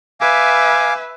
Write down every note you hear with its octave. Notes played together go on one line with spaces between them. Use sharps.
B4 E5 F5 G#5 D6